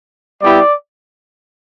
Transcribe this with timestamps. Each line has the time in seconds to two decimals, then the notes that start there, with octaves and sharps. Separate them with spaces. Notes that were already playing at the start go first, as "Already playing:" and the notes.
0.41 G3 B3 E4 G4 D5